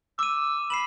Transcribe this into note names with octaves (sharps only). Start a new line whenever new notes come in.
D6 E6 D#7
B5 C7 E7 F#7